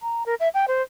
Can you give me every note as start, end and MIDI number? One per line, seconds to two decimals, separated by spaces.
0.01 0.23 82
0.26 0.35 70
0.40 0.49 76
0.54 0.65 79
0.68 0.82 72